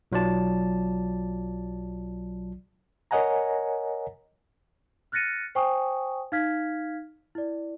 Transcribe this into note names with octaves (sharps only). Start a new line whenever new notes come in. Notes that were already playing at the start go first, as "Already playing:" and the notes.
B1 F#3 F4 D5 A5
A#4 C#5 D#5 F#5 G#5 A#5
F6 F#6 A6 A#6 C#7 D#7
C5 G5 G#5 C#6 D#6
D#4 F5 F6 G#6 B6
E4 D5